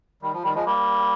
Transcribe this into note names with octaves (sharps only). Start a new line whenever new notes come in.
D#3 G3
F3
D#3 G3
F3 G#3
G3 A#3